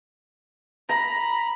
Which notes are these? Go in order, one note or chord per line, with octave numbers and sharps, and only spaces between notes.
A#5 B5